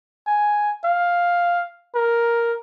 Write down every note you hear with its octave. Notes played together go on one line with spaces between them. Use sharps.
G#5
F5
A#4